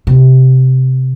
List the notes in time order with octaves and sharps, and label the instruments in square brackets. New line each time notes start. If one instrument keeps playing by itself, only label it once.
[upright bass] C3